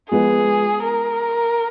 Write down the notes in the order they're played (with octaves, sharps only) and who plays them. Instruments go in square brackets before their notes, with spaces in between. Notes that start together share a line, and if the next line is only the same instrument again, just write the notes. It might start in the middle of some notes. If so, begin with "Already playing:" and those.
[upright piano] F3 G#3 B3 [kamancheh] G#4
[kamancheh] A#4